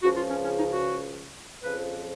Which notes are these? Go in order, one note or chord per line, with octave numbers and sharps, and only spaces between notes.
C#2 C#3 F3 F#4
F4
C#4
C#4
D#4
F#4
F2 C#3 F3 B4